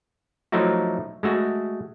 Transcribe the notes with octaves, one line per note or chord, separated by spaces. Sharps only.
F3 F#3 A3 D#4 E4 F#4
G#3 A3 F#4